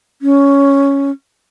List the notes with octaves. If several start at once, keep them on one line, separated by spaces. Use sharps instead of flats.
C#4